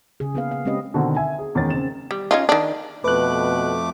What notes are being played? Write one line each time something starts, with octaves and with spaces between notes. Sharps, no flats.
C#3 G#4
A#3 B3 E4 G#4 B4 F5
F5
G#3 C4 C#4 G4 B4 D#5
B2 D3 D#3 C4 F#4
E5 G#5
G#4
E2 D#3 G#3 C#4 A6
C#3 C4 E7
G3
C#4 D#4 F4
D#3 D4
F2 B2 A3 B4 D6 F#6